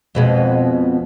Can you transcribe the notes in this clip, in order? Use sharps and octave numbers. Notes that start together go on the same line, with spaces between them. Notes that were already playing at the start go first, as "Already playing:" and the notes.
F2 B2 G#3